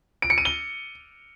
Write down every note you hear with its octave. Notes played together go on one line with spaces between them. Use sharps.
D7
C#7
D#7
G7